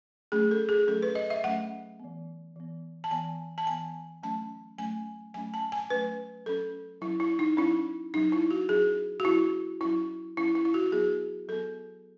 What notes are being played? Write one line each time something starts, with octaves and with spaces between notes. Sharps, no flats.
F#3 A3 C#4 G#4
A4
G#4
F#3 A3 C#4 A4
B4
D#5
E5
F#3 A3 C#4 F#5
E3 B3
E3 B3
A5
E3 B3 G#5
A5
E3 B3 G#5
F#3 A3 C#4 A5
F#3 A3 C#4 G#5
F#3 A3 C#4 G#5
A5
G#5
F#3 A3 C#4 B4
F#3 C#4 A4
F#3 C#4 E4
E4
D#4
F#3 C#4 E4
F#3 C#4 D#4
E4
F#4
F#3 C#4 G#4
F#4
F#3 C#4 E4
F#3 C#4 E4
F#3 C#4 E4
E4
E4
F#4
F#3 B3 G#4
F#3 B3 A4